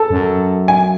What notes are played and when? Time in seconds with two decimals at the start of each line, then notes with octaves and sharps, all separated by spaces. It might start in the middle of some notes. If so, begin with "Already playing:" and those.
Already playing: A4 A5
0.10 F#2
0.68 G#5